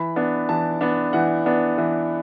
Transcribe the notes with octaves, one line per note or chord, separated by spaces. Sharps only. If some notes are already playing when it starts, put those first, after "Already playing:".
Already playing: E3 B5
B3 D4
E3 A5
B3 D4
E3 F#5
B3 D4
E3